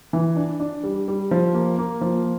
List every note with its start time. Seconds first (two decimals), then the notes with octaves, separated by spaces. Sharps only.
0.13 E3
0.36 D4
0.60 D4
0.84 G3
1.08 G3
1.31 F3
1.54 A#3
1.79 A#3
2.01 F3